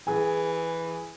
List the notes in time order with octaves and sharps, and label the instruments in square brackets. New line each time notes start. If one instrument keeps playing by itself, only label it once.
[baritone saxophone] E3 [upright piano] G#4 G#5